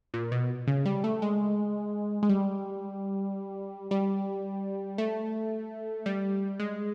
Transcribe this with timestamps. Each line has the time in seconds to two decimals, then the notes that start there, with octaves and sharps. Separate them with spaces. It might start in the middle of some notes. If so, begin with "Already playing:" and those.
0.14 A#2
0.32 B2
0.67 C#3
0.86 G3
1.04 A3
1.22 G#3
2.23 G#3
2.29 G3
3.91 G3
4.98 A3
6.06 G3
6.60 G#3